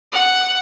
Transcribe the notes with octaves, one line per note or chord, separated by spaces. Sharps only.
F#5